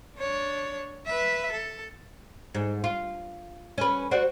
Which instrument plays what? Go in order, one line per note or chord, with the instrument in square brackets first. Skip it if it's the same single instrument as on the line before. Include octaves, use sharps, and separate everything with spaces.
[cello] D4 C#5
B4 E5
A4
[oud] G#2
F4
C#4 B4
F#4 C5 D5